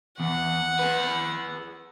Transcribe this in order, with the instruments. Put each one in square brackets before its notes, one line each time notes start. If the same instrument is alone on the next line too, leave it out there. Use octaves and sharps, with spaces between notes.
[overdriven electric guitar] E2 [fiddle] F#5
[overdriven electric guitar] G#4 B4